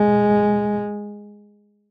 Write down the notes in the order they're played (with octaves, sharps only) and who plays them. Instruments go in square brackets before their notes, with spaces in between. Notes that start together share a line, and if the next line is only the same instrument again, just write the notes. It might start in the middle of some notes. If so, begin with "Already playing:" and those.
Already playing: [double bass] G#3